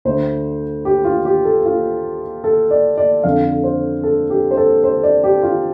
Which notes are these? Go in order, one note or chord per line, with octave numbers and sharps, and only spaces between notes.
D2 D3 C5
G4
F4
G4
A4
F4
A4
D5
D5
F2 D3 F5
C5
A4
G4
C5
A4
C5
D5
G4
F4